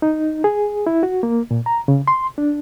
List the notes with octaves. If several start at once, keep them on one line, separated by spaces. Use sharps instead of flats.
D#4
G#4
E4
F#4
A#3
A#2
A#5
C#3
C6
D4